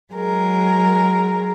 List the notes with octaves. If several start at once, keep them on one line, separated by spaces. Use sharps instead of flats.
F#3 G#3 A#4